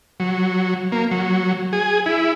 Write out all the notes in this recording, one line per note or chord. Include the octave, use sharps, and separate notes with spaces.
F#3
A#3
F#3
G#4
E4